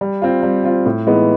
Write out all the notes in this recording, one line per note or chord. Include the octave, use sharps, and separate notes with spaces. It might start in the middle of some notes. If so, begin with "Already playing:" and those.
G3
C4 F4
G3
C4 F4
A2
E3 G#3 B3 D#4